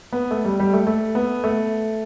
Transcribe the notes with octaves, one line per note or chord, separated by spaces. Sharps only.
B3
A3
G3
G3
A3
A3
B3
A3